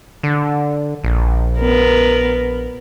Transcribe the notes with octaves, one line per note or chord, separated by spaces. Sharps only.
D3
A#1
B3 A#4